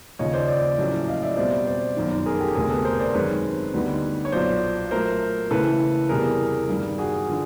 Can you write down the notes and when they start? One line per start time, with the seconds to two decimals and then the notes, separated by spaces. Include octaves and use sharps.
0.19 D#2 C#3 F3 C#5 D#5
0.33 C5 D5
0.48 C5 D5
0.78 A#1 A2 F#3 A3 C#4
1.08 D#5 F5
1.22 D5 E5
1.37 B2 G3 C4 C5 D5
1.67 C5 D5
1.96 G1 F#2 D#3
2.26 G#4 A#4
2.40 G4 A4
2.55 E1 D2 C3 G#4 A#4
2.70 A4 B4
2.85 A#4 C5
3.00 C5 D5
3.14 F#2 D#3 G#3 C4 B4 C#5
3.73 D2 D3 G3 B3 D#4
4.25 C#5
4.32 B1 A#2 F#3 C5 D5
4.91 A#2 F#3 A3 A#4 C5
5.51 C#3 E3 A3 C#4 E4 A4 B4
6.09 E2 C3 E3 G3 B3 G#4 A#4
6.69 G2 D#3 G3
6.98 F#4 G#4
7.28 D3 F3